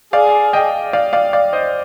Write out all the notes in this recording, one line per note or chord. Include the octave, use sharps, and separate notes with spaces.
G#4 D5 F5
D#5 G5
D5 F5
D5 F5
D5 F5
C5 D#5